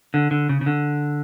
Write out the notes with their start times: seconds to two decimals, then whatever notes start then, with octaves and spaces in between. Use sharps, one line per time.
0.14 D3
0.31 D3
0.49 C#3
0.61 C#3
0.66 D3